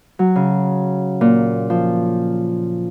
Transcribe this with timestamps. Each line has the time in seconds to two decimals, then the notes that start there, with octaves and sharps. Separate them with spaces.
0.19 F#3
0.36 C#3
1.21 A#2
1.70 F3